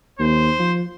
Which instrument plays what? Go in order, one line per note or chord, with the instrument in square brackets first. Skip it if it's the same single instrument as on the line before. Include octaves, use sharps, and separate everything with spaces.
[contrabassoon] D#2 [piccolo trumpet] C5
[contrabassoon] F3